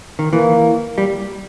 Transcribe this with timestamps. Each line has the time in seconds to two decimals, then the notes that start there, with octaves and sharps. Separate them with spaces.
0.19 D#3
0.33 E3 A#3
0.98 G3